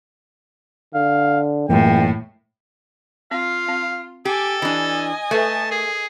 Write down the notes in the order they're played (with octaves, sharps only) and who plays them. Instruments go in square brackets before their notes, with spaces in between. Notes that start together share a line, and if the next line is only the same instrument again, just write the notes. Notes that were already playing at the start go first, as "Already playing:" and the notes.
[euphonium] D3 [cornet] F5
[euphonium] C#2 [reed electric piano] F#2 E3 A#3 [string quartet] A2 [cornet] G5
[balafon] C4 [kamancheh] F4 [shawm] F5
[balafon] C4
[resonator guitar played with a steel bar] G4 [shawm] A4 [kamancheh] G#5 D6
[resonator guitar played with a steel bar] E3 D4 [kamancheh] D#5 G#5
[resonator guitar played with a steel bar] A3 [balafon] A4 B4 E5 [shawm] A5
[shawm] G#4 [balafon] A#4